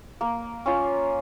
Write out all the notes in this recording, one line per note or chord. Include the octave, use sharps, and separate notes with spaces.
A#3
C#4 F4